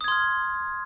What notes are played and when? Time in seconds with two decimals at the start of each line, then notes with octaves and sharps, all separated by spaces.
0.01 D#6
0.04 G#6
0.08 C6
0.12 F6